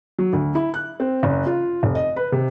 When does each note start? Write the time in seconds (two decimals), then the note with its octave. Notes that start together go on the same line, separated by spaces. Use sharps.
0.19 F#3
0.33 D2
0.55 E4
0.74 F#6
1.00 C4
1.23 F#1
1.46 F4
1.83 F1
1.95 D#5
2.16 B4
2.32 C3